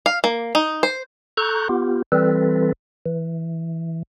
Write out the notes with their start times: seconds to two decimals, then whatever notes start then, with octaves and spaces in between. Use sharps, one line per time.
0.06 F5
0.24 A#3
0.55 D#4
0.83 C5
1.37 A4 A#5 C#6 F#6 G6
1.69 B3 F4 G4
2.12 E3 G3 C4 A4 B4
3.06 E3